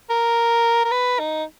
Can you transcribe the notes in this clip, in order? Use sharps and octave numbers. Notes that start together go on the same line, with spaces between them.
A#4
A#4
B4
D#4